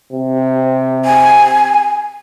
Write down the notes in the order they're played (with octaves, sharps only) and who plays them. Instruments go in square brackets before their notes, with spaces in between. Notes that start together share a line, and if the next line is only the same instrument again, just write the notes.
[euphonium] C3
[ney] G#5